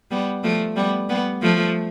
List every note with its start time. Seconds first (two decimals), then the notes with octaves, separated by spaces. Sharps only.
0.11 G3 B3
0.43 F3 A3
0.76 G3 B3
1.09 G3 B3
1.42 F3 A3